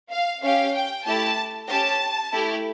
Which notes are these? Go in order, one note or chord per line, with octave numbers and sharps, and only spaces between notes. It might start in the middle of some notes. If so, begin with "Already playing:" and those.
F5
C#4 G4 F5
G5
A3 E4 G4 A5
C#4 G4 A5
A3 E4 G4